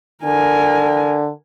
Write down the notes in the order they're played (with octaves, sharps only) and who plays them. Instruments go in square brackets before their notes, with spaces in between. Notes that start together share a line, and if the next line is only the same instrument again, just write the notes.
[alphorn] D3 [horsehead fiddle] A#4 G#5